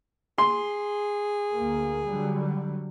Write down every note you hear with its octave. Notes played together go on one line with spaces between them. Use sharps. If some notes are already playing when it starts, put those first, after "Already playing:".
G#4 C6
D2 A#3
D3 F#3 G3